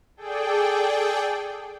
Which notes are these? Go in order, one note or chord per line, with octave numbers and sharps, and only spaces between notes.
G#4 A4 D5 G5